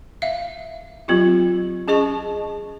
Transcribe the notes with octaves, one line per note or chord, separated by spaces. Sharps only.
E5 F5
F#3 C4 F4 G4
C#4 G#4 D#5 A5 C#6